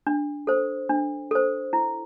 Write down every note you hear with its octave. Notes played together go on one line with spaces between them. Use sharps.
D4
A4 C5
D4
A4 C5
E4